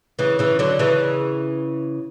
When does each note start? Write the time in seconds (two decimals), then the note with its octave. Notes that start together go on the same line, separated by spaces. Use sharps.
0.19 C#3 E3
0.39 C#3 E3
0.59 D3 F#3
0.79 C#3 E3